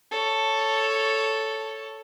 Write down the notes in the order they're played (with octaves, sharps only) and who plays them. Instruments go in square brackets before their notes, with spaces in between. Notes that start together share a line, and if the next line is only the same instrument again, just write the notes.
[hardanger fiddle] A4 C#5